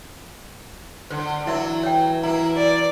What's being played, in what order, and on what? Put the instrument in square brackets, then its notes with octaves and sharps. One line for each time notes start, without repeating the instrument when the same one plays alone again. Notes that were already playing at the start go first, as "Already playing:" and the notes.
[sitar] D3 [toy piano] C5
[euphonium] E3 [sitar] F#3 [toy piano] E4 E5 E6
[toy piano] C#5 G5
[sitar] A#3 E4 [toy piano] A#5
[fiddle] D5